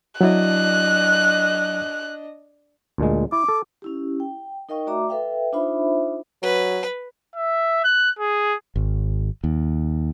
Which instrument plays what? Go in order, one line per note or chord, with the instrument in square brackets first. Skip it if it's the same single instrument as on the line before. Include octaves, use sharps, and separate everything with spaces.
[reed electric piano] F#3 E4 [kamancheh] D4 D#5 [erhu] F#6
[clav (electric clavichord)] D2 A#2 G#3
[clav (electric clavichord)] E4 [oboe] D6
[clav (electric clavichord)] A4
[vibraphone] C#4 E4 G4
G5
D#4 A#4 D#5 F5 G5 C#6
A3 F#4 D5 E5 A#5 D6
A4 B4 E5 F5 G5
D4 D#4 F4 C5 E5 B5
[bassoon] F#3 [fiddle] B4
[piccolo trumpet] E5
F#6
G#4
[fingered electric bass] G#1
D#2